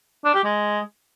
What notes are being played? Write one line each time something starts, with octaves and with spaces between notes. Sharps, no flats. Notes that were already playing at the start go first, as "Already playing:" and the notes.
D4
G4
G#3